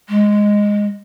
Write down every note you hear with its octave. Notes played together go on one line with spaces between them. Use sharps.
G#3